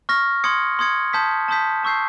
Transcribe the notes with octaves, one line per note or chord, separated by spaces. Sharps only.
C#6 F6 A#6
C6 D#6 G#6 C#7
C6 D#6 G#6 C#7
A5 C6 D#6 G6 B6
A5 C6 D#6 G6 B6
A5 C#6 E6 G6 C7